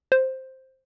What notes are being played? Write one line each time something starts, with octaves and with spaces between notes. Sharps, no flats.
C5